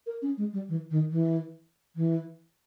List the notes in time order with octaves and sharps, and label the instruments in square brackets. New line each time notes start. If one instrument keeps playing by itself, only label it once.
[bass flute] A#4
C#4
G#3
G3
E3
D#3
E3
E3